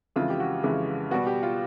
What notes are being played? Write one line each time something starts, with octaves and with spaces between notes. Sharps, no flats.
F2 C#3 E3 G#3 F4
G4
F#4
F2 C#3 E3 G#3
B2 G3 B3 F#4
G4
F4